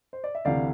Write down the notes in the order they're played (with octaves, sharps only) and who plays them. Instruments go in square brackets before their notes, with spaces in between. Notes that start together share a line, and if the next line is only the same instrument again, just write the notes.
[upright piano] C5
D5
E5
[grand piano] D2 C3 E3 [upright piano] D5 F5